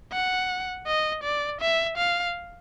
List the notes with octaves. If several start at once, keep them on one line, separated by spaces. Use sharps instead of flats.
F#5
D#5
D5
E5
F5